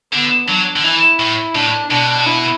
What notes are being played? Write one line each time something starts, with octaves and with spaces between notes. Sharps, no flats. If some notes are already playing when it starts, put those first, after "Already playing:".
D3 B3
F#3 D4
D3
E3 E4
A2
A2 D4
B2 D4
E4